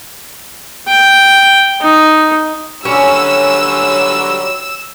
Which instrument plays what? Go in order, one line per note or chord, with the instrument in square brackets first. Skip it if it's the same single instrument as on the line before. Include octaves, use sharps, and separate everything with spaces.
[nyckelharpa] G5
D#4
[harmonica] D3 F#3 G3 [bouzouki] C#4 [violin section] E6